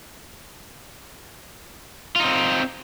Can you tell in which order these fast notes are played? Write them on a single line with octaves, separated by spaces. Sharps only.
F4 D#4 C4